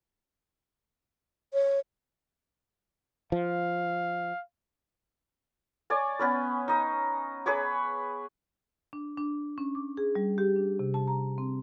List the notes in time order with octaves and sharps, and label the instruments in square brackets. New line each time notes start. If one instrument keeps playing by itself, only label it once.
[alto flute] C#5
[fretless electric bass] F3 [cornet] F5
[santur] C#5 D5 G#5
B3 C#4 B4
D#4 D#5
G#4 B4 C#5 D6
[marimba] D4
D4
C#4
D6
G#4
G3
G4
D4
C3
A5
A#5
C4